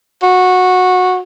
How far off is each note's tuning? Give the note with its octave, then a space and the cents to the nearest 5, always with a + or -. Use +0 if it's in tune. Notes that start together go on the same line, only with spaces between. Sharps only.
F#4 -15